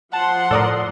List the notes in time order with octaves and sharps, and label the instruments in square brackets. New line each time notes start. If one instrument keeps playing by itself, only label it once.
[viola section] F3 C6 [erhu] F#5 [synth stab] A5
[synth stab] A2 D5 D#6 [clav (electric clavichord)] A4 A#4